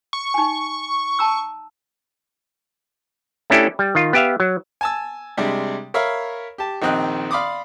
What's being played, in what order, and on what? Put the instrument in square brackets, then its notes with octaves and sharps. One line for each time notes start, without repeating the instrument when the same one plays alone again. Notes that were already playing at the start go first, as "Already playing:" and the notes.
[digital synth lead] C#6
[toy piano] D#4 G#5
A5 A#5 E6
[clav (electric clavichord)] A3 C#4 D4 E4 G4 A4
G3
D#3 F4
B3 G4 E5 F5
F#3
[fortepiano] G#5 A5 E6
C3 G3 G#3 D4
A#4 C#5 E5 F5 B5
G4 A5
A#1 D#3 C4 D#5 G5 F#6
D5 F5 B5 C6 D6 D#6